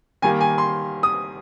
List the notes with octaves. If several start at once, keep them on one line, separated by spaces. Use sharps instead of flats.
D#3 G3 A#3 G#5
G#5
C6
D#6